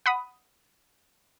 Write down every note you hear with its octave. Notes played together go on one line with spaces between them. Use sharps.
F#5 B5 D#6